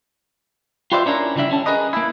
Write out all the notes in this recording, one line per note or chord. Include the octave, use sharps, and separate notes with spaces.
F4 G4 B4 C5 D5 E5
C#4 D4 E4 A#4
C#3 E3 G3 D4 E5
G3 C#4 A5
G#4 A#4 B4 D#5
A#3 E4